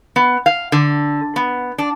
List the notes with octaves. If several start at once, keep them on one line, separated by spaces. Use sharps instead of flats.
B3
F5
D3
B3
D4